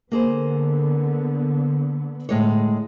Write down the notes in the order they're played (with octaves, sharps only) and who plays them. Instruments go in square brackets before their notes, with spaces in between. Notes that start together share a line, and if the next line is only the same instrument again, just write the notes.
[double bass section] D3 B3 [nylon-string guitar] A#3 G#4 C5
[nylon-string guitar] A2 G#3 C#5